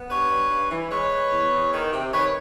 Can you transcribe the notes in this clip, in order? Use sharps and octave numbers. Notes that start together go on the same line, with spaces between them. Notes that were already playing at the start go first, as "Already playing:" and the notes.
Already playing: B3
G2 B4 C#5
G2
G2
E3
G#3 B4 C#5
G#3
E2
E2
D#3
C3
D#3 B4 C#5